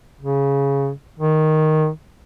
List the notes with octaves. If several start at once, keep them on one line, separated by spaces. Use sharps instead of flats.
C#3
D#3